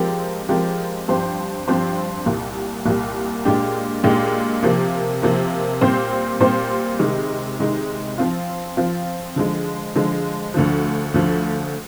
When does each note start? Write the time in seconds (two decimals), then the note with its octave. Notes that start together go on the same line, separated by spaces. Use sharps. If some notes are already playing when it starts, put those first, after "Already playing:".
Already playing: F3 G#3 C4 G4 A#4
0.49 F3 G#3 C4 G4 A#4
1.08 G2 F3 C4 G4 C5
1.68 G2 F3 C4 G4 C5
2.26 C2 A#2 G3
2.86 C2 A#2 G3
3.45 A#2 G#3 D4 G4
4.03 A#2 G#3 D4 G4
4.63 C3 F3 A#3
5.22 C3 F3 A#3
5.81 A#2 G3 C4 G4 C5
6.40 A#2 G3 C4 G4 C5
6.99 C3 D#3 G#3 D#4
7.59 C3 D#3 G#3 D#4
8.18 F3 C4 F4
8.77 F3 C4 F4
9.36 D3 F3 G#3
9.95 D3 F3 G#3
10.54 D2 D3 F3
11.14 D2 D3 F3